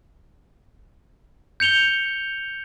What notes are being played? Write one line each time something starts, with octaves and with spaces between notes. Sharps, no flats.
G6 C#7 F7 G7